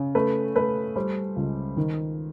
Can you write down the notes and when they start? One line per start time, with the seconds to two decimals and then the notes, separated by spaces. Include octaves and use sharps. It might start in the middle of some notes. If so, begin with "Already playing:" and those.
Already playing: C#3
0.15 A3 B4
0.56 A3 B4
0.96 G3 C5
1.36 C#2
1.77 D#3